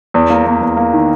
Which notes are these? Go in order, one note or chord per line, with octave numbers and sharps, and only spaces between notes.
E2
A#3
E2
E2
A#3
D#3